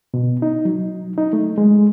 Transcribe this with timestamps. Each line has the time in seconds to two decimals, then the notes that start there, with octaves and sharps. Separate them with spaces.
0.14 B2
0.42 D#4
0.65 F#3
1.18 D#4
1.33 A3
1.58 G#3